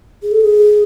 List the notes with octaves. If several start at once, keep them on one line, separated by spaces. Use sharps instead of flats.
G#4
A4
G#4